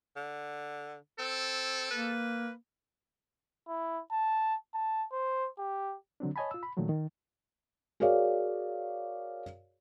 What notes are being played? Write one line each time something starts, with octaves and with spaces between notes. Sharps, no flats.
D3
C4 A4
A#3 B4
E4
A5
A5
C5
G4
D3 F#3 C4 D4
C#5 D#5 G#5 A5 B5
F4 E6
B5
A#2 D#3 F3 F#3 A3
D#3
F#4 G#4 A#4 C#5 D5 F5